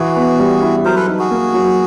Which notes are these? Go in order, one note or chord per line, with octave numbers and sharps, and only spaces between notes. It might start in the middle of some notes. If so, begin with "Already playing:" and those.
Already playing: E3 F#4 G#4
B3
G3
E4
F#3 A#4 C5
A4 B4
D#4
F#4 G#4
A#3
F#3